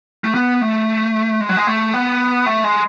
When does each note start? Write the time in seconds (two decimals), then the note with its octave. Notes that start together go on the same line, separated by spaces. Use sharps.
0.24 A3
0.34 B3
0.61 A3
1.41 G#3
1.49 F#3
1.57 G#3
1.67 A3
1.94 B3
2.46 A3
2.64 G#3